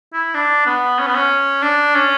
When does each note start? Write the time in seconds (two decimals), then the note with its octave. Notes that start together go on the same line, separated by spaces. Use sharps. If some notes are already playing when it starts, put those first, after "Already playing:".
0.13 E4
0.35 D4
0.66 B3
0.99 C#4
1.07 B3
1.15 C#4
1.62 D4
1.95 C#4